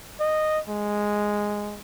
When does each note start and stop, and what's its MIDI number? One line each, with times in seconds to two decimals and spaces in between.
0.20 0.60 75
0.69 1.79 56